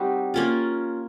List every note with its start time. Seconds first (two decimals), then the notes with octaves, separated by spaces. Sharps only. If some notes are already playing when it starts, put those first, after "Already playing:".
Already playing: G3 C4 D#4 F#4
0.34 A#3 C#4 F4